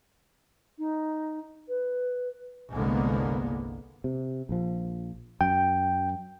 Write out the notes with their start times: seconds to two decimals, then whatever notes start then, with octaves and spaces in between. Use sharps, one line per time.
0.79 D#4
1.69 B4
2.72 G1 C2 D3 G#3 A#3 B3
4.04 C3
4.49 A#1 F3
5.41 F#2 G5